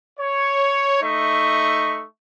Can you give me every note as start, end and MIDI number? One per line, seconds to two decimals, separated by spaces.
0.20 1.02 73
1.02 2.04 57
1.02 2.04 63
1.02 2.04 76
1.02 2.04 85